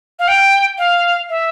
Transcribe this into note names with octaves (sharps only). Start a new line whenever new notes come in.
F5
G5
F5
E5